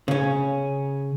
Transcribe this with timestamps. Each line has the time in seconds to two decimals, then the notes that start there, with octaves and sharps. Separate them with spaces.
0.08 C#3 C#4